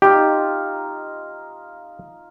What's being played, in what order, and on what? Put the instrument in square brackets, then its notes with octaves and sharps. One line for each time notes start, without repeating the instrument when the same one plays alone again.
[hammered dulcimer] D#4 F4 [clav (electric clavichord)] G4